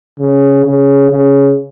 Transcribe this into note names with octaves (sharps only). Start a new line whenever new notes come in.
C#3
C#3
C#3